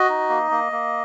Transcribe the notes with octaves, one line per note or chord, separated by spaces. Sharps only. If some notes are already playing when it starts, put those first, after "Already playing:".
Already playing: F#4 D#5
D#4
A#3
A#3
A#3